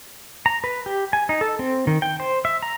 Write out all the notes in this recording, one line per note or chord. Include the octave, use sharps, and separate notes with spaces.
A#5
B4
G4
G#5
D#4
A4
C4
D#3
G5
C5
E5
A#5